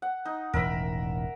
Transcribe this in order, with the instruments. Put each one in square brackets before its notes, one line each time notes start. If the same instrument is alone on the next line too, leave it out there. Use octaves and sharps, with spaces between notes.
[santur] F#5
D#4
[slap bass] E1 A1 D#3 [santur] A#4 E5 B5